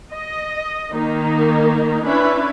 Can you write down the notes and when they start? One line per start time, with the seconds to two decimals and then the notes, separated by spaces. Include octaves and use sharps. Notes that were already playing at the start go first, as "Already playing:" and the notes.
0.12 D#5
0.93 D#3 A#3 D#4
2.05 C#4 D4 E4 B4